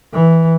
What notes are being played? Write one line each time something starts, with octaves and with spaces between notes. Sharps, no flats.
E3